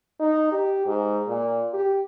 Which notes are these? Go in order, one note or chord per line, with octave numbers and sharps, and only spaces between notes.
D#4
G4
G#2
A#2
G4